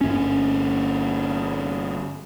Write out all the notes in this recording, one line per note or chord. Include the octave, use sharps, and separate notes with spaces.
G1 C#4